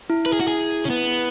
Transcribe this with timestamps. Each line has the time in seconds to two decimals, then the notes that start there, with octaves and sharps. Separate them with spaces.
0.10 E4
0.26 B4
0.33 G#4
0.40 F#4
0.48 G#4
0.85 C#4
0.90 B3